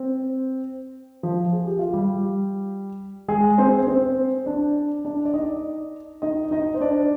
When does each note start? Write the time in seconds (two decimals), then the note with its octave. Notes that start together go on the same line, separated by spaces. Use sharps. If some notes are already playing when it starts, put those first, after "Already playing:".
Already playing: C4
1.23 F3 F4
1.53 G#4
1.67 G4
1.79 F4
1.94 G3 G4
3.28 G#3 G#4
3.58 C4 C5
3.87 C4 C5
4.46 D4 D5
5.05 D4 D5
5.25 D5
5.34 D#4 D#5
6.22 D#4 D#5
6.51 D#4 D#5
6.74 C5
6.81 D4 D5